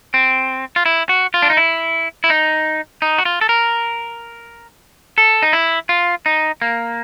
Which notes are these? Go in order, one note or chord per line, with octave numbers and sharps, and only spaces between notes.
C4
F4
E4
F#4
F4
D4
D#4
E4
E4
D#4
D#4
F#4
F4
A4
A#4
A4
D#4
E4
F4
D#4
A#3